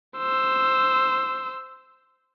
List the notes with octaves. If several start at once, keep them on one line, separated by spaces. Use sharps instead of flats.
C5 E6